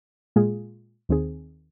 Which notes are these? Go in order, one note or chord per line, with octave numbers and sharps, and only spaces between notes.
A#2 G#3 F4 G#4
D#2 D#3 C4 G#4